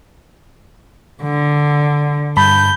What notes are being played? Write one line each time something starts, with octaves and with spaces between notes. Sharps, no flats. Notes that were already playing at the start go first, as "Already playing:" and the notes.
D3
G2 A5 B5 G6